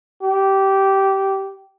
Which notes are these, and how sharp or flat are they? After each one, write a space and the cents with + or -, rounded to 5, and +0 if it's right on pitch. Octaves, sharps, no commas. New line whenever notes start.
G4 -15